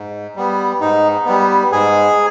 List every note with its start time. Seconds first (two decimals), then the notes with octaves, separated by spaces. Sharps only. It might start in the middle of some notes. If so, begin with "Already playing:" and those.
Already playing: G#2
0.36 G3 B3
0.81 G#2 D#4
1.26 G3 B3
1.72 G#2 G#4